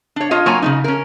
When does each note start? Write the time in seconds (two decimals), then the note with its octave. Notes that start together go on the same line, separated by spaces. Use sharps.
0.16 D4 C#5
0.31 F4 C#5 D#5
0.46 F#3 A#3 F4 C#5 G#5 A#5
0.62 C#3 A3 D#4
0.84 C#4 A#4